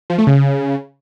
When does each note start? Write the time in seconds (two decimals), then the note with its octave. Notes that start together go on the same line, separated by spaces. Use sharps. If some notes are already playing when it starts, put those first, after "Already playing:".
0.10 F3
0.18 A3
0.27 C#3